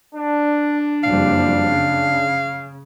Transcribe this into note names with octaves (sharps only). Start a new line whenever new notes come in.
D4
F#1 F2 G3 F5
C#3